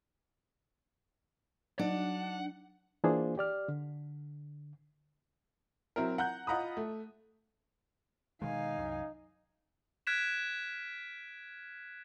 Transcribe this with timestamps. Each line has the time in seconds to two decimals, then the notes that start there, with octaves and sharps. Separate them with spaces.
1.79 F#3 D4 D#4 F#5
3.04 E3 A#3 D4 F4 G#4 C5
3.38 G4 D5 F6
3.68 D3
5.96 F#3 C4 E4 A#4
6.18 F#5 A#5 F#6 G6
6.47 F4 D#5 F#5 A#5 B5 D#6
6.77 A3
8.42 B2 D#3 G#3 D#4 F5 G#5
8.78 C2 F#2
10.07 F6 F#6 G#6 B6 D7 E7